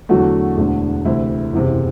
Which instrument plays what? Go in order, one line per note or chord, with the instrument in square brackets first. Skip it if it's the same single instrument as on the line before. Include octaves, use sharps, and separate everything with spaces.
[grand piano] E2 D3 F#3 A3 F#4
E1 D2 D3
D2 C3 E3 E4
F#1 E2 C3